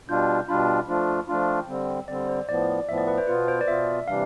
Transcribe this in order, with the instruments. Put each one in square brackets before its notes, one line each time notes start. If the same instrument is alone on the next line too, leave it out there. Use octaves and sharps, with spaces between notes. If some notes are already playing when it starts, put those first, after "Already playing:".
[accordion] B2 G3 D4 F4 [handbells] G6
[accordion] B2 G3 D4 F4 [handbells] B5
[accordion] F3 A3 D4 F4
[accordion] F3 A3 D4 F4 [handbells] B5
[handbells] F5
G5
[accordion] D3 G3 C4
[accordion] D3 G3 C4 [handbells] D5
[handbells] C5
[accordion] A2 F3 B3 [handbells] D5
[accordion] A2 F3 B3 [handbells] E5
[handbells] D5
B4
C5
[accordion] B2 B3 F4 [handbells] B4
[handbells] C5
D5
[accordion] B2 B3 F4 [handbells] E5
[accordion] C3 E3 G3 D4 [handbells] F5